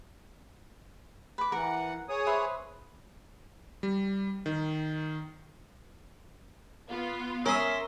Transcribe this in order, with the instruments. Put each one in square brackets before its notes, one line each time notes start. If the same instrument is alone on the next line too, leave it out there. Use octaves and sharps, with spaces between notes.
[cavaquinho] B4 D6
[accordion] E3 F#5 [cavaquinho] A#4
[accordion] G#4 C#5 D#6
[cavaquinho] B4 C5 E5
[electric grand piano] G3
D#3
[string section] B3 F4
[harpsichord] C#4 D#6 [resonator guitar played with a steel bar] A#4 [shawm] E5 [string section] C6